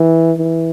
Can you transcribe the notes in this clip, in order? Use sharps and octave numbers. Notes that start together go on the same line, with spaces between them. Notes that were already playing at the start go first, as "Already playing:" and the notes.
Already playing: E3
E3